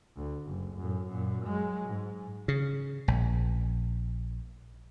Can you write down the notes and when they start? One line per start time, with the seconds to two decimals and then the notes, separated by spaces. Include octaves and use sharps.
0.16 D2
0.46 F#1
0.78 F#2 A2
1.08 F#2 A#2
1.45 F#3 G#3
1.86 G#2
2.48 C#3
3.08 A#1